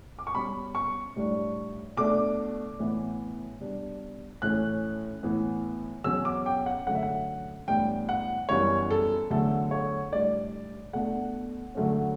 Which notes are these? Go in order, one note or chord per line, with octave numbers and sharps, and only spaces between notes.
D6
C#6
B2 G3 C#4 B5
C#6
A2 G3 D4
B2 A3 D4 D6
A2 E3 B3
B2 G3 D4
A2 E3 A3 C#4 F#6
A2 E3 B3
E2 B2 F#3 C#4 E6
D6
G5
F#5
D3 F#3 A3 C#4 F#5
E5
F#5
A2 E3 G3 B3 D4 G5
F#5
F#2 E3 G3 B3 C#5
A4
E2 D3 F#3 A3 A4
C#5
A2 G3 D4 D5
B2 A3 D4 F#5
D3 F#3 A3 C#4